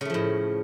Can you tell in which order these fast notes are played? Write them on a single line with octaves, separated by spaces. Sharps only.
C#3 A3 F3 A2